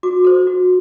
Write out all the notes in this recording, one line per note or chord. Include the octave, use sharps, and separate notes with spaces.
F#4 D6
A4 C5
F#4